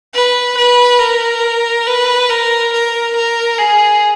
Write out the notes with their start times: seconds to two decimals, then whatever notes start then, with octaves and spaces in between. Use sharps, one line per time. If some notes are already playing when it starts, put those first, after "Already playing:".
0.14 B4
0.57 B4
1.00 A#4
1.87 B4
2.30 A#4
2.72 A#4
3.16 A#4
3.58 G#4